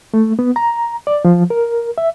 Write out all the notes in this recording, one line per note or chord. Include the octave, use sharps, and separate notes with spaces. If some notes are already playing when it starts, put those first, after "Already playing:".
A3
B3
A#5
D5
F3
A#4
E5